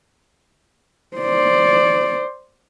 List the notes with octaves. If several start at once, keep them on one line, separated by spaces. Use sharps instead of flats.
C5 D5